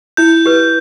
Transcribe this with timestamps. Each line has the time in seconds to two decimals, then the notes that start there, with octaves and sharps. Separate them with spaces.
0.17 E4 G6
0.46 G4 B4